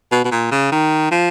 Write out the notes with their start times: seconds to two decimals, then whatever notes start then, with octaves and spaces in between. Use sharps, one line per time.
0.12 B2
0.25 B2
0.31 A#2
0.52 C#3
0.72 D#3
1.11 F3